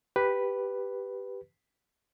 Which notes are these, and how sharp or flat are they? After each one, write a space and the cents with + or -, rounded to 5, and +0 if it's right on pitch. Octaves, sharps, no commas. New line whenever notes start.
G4 +0 B4 +0